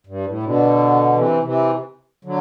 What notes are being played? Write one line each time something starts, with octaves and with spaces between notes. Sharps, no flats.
G2
A2
B2 D3
C3 E3
C3 E3
D3 F#3